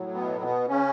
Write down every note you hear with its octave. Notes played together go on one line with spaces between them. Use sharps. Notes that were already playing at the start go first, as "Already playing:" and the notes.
Already playing: A2 F#3
B2 B3
B2 B3
C#3 C#4